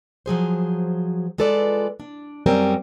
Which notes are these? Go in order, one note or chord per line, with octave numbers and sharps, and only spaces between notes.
F3 F#3 G#4 C5
G#3 F4 A4 B4 D5
D4
F#2 G3 C4 C#4 A#4 G#5